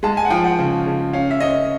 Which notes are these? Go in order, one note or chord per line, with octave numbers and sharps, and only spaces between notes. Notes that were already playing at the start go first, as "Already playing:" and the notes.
G#3 A5
G#5
F#5
F3 G5
F#5
C#3
C#3
C#4 F5
E5
C#4 D#5